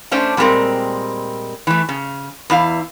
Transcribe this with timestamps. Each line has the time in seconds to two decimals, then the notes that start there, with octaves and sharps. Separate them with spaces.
0.11 A3 C#4 D4 C5
0.37 A#2 G3 G#3 B3 C4 A#4
1.67 E3 A3
1.89 C#3
2.50 E2 E4 F5